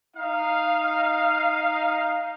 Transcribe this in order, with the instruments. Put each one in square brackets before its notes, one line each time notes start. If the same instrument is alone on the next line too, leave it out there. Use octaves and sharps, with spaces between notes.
[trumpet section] D#4 F5